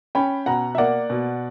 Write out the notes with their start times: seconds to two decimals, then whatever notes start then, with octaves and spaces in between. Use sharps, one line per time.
0.15 C#4 G5 B5
0.46 B2 F#5 A#5
0.75 E5
0.78 A#3 D5 F#5
1.10 B2